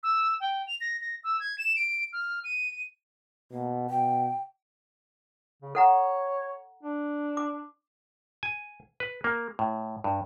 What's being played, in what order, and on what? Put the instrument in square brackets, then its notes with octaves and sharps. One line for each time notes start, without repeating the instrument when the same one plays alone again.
[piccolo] E6
G5
F7
A#6
A#6
E6
G#6
E7
D7
F6
D#7
[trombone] B2 [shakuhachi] A#3
[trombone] B2 [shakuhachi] G5
[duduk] C#3
[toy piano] A4 F#5 A#5 [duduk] C#5
[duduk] D4
[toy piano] D6
[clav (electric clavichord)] G#5
B4
A#3
A2
G2